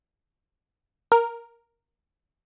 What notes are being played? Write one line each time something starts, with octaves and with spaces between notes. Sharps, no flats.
A#4